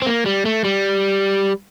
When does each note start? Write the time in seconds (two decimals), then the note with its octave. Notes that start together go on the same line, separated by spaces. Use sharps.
0.02 C4
0.06 A#3
0.26 G3
0.45 A3
0.64 G3